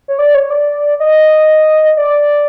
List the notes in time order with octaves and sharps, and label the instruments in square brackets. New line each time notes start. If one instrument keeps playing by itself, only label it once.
[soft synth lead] C#5
D5
C#5
D5
D#5
D5